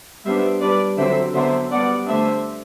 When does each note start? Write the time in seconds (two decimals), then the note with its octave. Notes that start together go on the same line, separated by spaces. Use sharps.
0.25 G3 B3 D4 C5 E5
0.61 G3 D4 B4 D5
0.98 D3 F#3 C4 C5 E5
1.34 D3 F#3 B3 D4 C5 E5
1.71 G3 B3 D4 D5 F#5
2.07 D3 A3 D4 C5 E5